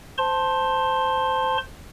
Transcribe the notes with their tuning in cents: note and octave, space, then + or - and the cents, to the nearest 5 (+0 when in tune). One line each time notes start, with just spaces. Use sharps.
C5 -15 A5 +5 C6 +20